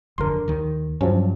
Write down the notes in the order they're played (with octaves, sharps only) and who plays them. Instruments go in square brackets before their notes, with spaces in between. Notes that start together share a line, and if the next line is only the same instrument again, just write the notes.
[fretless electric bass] F#1 F2 D3 [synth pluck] A#4 C6
[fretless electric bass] D#2 D#3
[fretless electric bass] G2 [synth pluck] F3 F#3 C#4